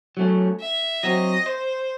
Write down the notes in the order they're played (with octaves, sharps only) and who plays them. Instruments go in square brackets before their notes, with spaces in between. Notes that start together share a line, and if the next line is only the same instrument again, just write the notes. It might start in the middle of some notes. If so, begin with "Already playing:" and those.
[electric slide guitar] F#3 A3 C#4
[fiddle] E5
[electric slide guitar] F#3 C4 F#4 [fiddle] D#5
[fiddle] C5